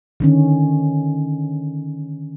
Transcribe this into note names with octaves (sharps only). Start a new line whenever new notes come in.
D3 D#3 C#4